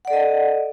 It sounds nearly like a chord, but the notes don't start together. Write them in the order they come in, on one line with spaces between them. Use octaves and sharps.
F#5 D5 A4 D#5